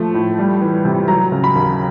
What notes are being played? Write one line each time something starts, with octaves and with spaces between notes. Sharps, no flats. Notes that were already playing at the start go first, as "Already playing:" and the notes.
Already playing: F3 A3
A2
G3
E3
C3
F#3 A#5
C#3
B5
D#2